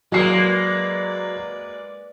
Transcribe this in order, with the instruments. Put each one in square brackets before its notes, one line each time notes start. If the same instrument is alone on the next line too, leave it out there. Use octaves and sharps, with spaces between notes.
[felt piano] F#3 C7 [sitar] G#3 A#3 [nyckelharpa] B4 D5